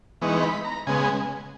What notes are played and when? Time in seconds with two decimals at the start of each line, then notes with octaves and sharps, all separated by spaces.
0.21 E3 G#3 B3 D#4 C#6
0.43 B5
0.65 A#5
0.87 C#3 G#3 B3 G#5